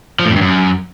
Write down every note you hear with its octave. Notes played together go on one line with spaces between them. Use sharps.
F3
A2
F2
G2
F#2